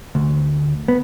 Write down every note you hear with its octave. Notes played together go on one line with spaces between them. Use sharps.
D2
B3